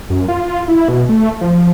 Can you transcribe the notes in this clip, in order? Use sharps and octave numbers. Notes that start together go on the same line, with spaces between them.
F#2
F4
E4
B2
A3
F3